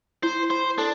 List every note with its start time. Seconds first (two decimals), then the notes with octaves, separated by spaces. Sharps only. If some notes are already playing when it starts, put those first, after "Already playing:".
0.23 E4 C5
0.50 C5 B5
0.78 D4 A4